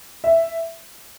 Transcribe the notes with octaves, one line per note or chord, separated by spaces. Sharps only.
E5